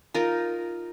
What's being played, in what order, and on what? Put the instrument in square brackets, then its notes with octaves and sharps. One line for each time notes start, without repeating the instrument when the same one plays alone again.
[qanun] D#4 F4 A#4